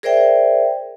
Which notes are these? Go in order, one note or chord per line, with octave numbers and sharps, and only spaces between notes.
G#4 A#4 C5 D5 E5 G5